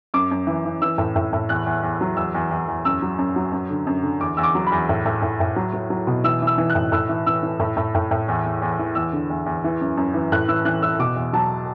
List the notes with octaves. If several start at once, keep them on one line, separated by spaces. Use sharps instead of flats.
F#2 D6
F#2
E3
E3
E3 E6
A2
A2
A2
E2 F#6
E2
E2
F#3
E2 E6
E2
E2
E2
F#2 E6
F#3
F#2
F#3
F#2
D3
F#2
D3
E2 D6
E2 E6
D6
F#3
B5
E2
A2
A2
A2
A2
F#3
F#3
F#3
B2
E3 E6
E3
E6
E3
F#6
A2
A2 E6
E3
E3 E6
E3
A2
A2
A2
A2
E2
E2
E2
E3
E2 E6
D3
E2
E2
E3
F#2
F#2
E3
A2 F#6
E3 E6
E3 F#6
E3 E6
B2 D6
E2
F#3 A5